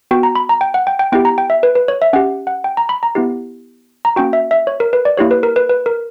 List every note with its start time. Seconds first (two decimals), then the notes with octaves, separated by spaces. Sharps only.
0.11 B3 F#4 G5
0.23 A#5
0.36 B5
0.49 A#5
0.61 G5
0.74 F#5
0.87 G5
0.99 G5
1.12 B3 E4 G4 G5
1.25 A#5
1.38 G5
1.50 E5
1.63 B4
1.75 B4
1.88 C#5
2.02 E5
2.13 C#4 G4 F#5
2.47 F#5
2.64 G5
2.77 A#5
2.89 B5
3.03 A#5
3.15 B3 E4 G4
4.05 A#5
4.16 A#3 C#4 F#4 G5
4.33 E5
4.51 E5
4.67 C#5
4.80 A#4
4.93 B4
5.05 D5
5.17 A#3 E4 G4 C#5
5.31 B4
5.43 A#4
5.56 B4
5.69 B4
5.86 A#4